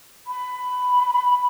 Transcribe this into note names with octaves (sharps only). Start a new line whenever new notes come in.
B5